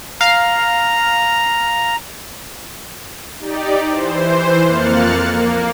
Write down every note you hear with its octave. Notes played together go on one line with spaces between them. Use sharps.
F5 A#5 F6
D#4 G4 D5
E3 C5
F2 A#3 F6 F#6 A6 C#7
A#3